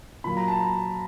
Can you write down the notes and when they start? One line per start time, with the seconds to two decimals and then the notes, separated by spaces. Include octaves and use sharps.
0.24 A#2 F#3 A#3 B5
0.37 A#5
0.48 A5
0.60 A#5